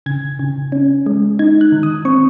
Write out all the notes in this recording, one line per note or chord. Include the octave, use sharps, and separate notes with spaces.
C#3 G#6
C#3
C#4
G#3
D#4 G#6
F#6
D#3
D#6
C4 C#6